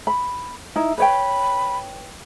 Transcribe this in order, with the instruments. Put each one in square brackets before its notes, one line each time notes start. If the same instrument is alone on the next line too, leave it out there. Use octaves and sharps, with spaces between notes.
[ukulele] B5
D#4 E4
[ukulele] B4 C#5 G5 [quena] B5